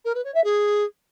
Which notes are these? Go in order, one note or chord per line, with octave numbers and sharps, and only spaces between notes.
A#4
B4
C#5
E5
G#4